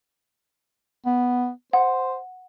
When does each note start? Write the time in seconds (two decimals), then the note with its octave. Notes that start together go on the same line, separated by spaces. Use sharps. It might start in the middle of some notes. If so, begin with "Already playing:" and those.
1.06 B3
1.73 C5 F#5